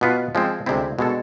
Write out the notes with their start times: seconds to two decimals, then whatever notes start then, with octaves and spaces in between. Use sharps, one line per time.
0.01 B2 B3 F4 B4
0.35 F3 G#3 C4
0.66 D2 C3 G#3 C4 E4
0.99 B2 G#3 D4 A4